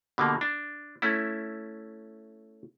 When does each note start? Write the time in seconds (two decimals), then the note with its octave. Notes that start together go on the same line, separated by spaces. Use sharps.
0.18 B2 D3 G3 A#3
0.41 D4
1.02 A3 C#4 E4